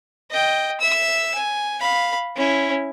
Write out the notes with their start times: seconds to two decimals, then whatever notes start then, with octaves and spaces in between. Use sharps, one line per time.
0.30 D#5 G5
0.80 E5 E6
1.34 G#5
1.81 F5 B5
2.36 C#4 E4